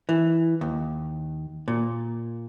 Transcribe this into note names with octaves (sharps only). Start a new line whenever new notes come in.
E3
D#2
A#2